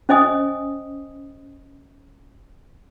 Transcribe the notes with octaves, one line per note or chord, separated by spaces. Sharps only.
C#4 C5 D#5 G#5 D#6